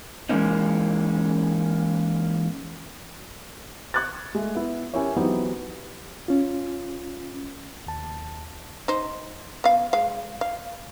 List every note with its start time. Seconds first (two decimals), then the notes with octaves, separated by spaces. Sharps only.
0.29 E3 G#3 A#3 C#4 D#4
3.94 C#6 F#6 G#6 A6
4.35 G#3 A3
4.55 B3 E4
4.94 C#4 E4 G4 A#4 C#5
5.16 E3 F#3 B3 C4 D#4 G4
6.28 C#4 F4
7.86 D#2 A5
8.88 D#4 C5
9.64 B3 F5
9.93 G#3 F5
10.41 F5